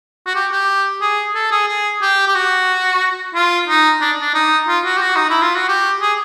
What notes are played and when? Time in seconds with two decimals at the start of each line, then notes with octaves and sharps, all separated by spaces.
0.26 F#4
0.35 G4
0.52 G4
1.01 G#4
1.35 A4
1.51 G#4
1.68 G#4
2.02 G4
2.28 G4
2.35 F#4
3.35 F4
3.68 D#4
4.01 D4
4.21 D4
4.34 D#4
4.68 F4
4.85 F#4
4.98 G4
5.02 F#4
5.16 D#4
5.30 E4
5.42 F4
5.55 F#4
5.68 G4
6.01 G#4